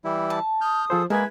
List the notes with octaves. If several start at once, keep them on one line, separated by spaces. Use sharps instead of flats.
E3 G3 E4
A5
D#6 F6 G6
F3 F4 G#4 A4 C5
G#3 A#3 E4 G#4 A#4 B4 G#6